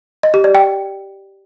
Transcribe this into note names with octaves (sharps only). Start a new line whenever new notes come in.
D#5
G4
D5
G5